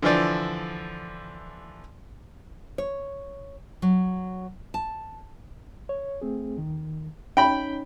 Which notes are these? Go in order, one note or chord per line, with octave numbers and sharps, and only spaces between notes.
D3 E3 F3 D5
C#5
F#3
A5
C#5
A3 C4 G#4
D#2 D#3
C#4 D#4 C#5 G5 B5